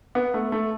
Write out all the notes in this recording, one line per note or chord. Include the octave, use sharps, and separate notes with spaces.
B3
A3
A3